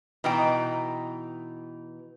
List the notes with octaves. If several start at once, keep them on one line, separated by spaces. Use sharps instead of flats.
B2 E3 D#4 G5